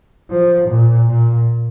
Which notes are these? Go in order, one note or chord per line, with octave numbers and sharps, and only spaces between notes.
F3
A#2
A#2